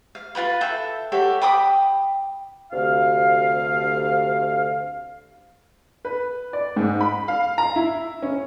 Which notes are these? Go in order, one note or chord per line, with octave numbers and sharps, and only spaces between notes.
F5
F4 F#4 B4 B5
A4 E5 G5
F#4 G4 A4 C#5
G5 B5 D6 D#6
D2 C3 F5
B4
D5
G#2
B5
F5
A#5
E4
C#4